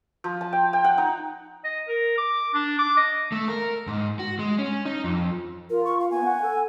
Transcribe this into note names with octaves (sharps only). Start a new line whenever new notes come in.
F3
A5
G5
G5
F#5
D#4
D#5
A#4
D6
D4
D6
D#5
A3
A#4
G#2
F#4
G#3
C#4
D#4
F2
F4 A#4
C#6
F5
B3 G#5
F#5
A4